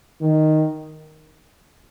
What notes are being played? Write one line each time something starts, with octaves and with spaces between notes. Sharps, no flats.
D#3